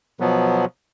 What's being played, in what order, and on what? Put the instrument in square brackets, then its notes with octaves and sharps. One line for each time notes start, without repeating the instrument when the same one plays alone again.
[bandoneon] B2 F3 F#3 B3